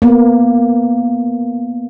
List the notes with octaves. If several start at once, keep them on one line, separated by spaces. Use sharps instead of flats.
A#3 B3